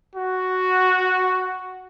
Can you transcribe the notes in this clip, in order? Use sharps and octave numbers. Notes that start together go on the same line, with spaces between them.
F#4